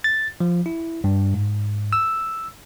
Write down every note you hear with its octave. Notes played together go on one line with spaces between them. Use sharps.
A6
F3
E4
G2
G#2
E6